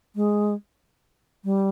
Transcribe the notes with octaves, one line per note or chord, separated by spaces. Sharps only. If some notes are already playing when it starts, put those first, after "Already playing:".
G#3
G3